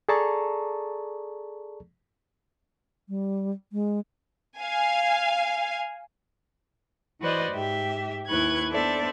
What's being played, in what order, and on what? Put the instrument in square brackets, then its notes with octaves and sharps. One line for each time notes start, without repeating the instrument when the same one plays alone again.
[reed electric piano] G#4 A4 D5 A5 A#5 C#6
[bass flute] G3
G#3
[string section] F5 G#5
[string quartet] E3 F#4 B4 C5 D5 D#5
G#2 G4 E5
D#2 E4 B4 C#6 F#6 G#6
B3 D4 A4 C5 D5 E5